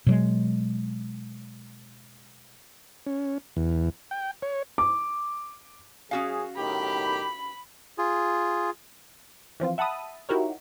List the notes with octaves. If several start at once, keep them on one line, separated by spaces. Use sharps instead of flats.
B2 F#3 G#3
C#4
E2
G5
C#5
D6
F#2 C#4 F#4 G#4 F5
B1 A2 D#3 G4 B5
F4 G#4
E3 F3 C4 F4
E5 F#5 A5 B5 D#6
D#4 E4 F#4 G4 A#4 C#5